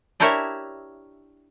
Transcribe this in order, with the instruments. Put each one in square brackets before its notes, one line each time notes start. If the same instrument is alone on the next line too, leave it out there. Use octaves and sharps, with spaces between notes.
[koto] D4 E4 G4 A#4 C#5 E5